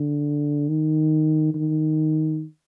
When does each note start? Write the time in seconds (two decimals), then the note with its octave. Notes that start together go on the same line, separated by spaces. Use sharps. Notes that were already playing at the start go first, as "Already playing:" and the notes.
Already playing: D3
0.69 D#3
1.54 D#3